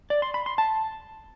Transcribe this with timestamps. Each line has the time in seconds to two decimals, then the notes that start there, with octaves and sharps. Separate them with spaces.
0.10 D5
0.22 C6
0.34 B5
0.46 C6
0.58 A5